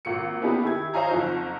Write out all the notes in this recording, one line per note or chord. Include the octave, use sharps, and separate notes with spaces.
G#1 A#2 C#7
A#3 B3 C#4 D#4 G4 G#4
D#3 E4 G4 G#6
C5 C#5 D#5 F5 G#5 A#5
F#1 F2 D#4